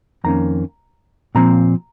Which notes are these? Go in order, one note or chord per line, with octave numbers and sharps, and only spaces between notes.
F2 D#3 A#3 C#4 A#5
A#2 F3 C4 A#5